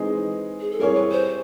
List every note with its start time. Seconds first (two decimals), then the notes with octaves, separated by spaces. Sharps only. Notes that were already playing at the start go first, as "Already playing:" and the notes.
Already playing: E3 G#3 C4 D#4 G#4
0.60 G#4
0.71 A4
0.79 G3 C4 E4 G#4 A#4 C#5
0.95 B4
1.12 C5